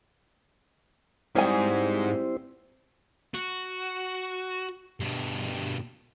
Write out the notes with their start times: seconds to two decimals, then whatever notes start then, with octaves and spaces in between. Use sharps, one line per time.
1.35 G#2 G3 C4 E4 G#4 C5 G#5
3.34 F#4
5.00 G2 B2